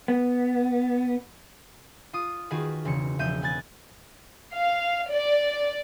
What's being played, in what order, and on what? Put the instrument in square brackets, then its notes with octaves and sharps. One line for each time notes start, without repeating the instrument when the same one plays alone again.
[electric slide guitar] B3
[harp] F4 D#6
D#3 F4 F#4 G#4 B4
E1 C#3 C4 C#7
E1 F3 E5 G6 D#7
B3 G#5 F#6 A6
[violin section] F5
D5